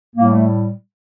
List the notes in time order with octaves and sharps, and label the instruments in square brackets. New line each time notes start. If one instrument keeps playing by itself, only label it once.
[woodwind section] A2 G3 A#3
A3